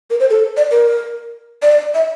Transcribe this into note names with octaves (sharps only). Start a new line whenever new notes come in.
A#4
C5
A4
D5
A#4
D5
E5